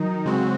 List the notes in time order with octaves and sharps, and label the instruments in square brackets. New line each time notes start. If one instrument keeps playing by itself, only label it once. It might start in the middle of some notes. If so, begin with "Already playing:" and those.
Already playing: [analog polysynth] D#3 D#4 [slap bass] F#3
[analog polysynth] C#3 G#3 C4 F#4